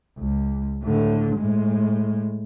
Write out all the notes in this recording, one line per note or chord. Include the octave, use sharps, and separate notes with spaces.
C#2
A2 D3
A2 G#3